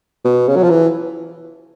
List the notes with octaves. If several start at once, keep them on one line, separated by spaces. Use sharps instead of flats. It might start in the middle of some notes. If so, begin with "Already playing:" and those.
B2
C#3
F#3
F3
E3